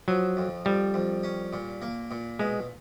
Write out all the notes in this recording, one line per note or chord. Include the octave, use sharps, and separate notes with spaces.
F3 F#3
F2
F2 G3
F2
C#4
A#2
A#3
A#2
B2 G#3